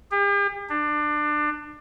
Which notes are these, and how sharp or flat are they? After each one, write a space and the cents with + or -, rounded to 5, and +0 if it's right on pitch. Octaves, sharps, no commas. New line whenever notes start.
G4 +45
D4 +25